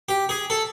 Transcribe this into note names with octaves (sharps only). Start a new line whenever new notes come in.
G4
G#4
A4